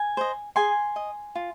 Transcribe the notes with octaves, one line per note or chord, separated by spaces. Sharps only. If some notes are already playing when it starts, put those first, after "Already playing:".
Already playing: G#5
C5 D#5
G#4 G#5 C6
D#5
F4